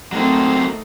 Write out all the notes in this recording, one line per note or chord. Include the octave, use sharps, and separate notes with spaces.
F#3 A3 A#3 C4 D#4 C5